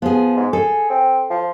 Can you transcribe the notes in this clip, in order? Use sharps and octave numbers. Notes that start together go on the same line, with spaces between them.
F3 B3 G#4
G#2
G#4 A4
C4
F3